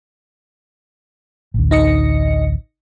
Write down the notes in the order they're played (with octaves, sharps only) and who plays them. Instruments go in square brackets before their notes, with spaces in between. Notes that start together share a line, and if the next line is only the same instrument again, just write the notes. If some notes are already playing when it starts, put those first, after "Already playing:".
[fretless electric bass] A1 D2
[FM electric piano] D#4 D#5 C#7